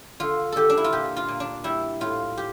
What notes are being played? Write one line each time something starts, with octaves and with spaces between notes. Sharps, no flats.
D3 F4
D3 G4 A4
D4
E4
F4
A#2 G4
F4
A#2
D4
G3 E4
A2 F4
G4